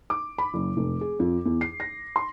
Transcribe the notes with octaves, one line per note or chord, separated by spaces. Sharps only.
D6
B5
F#1
F1
G#4
F2
E2
C7
A#6
C6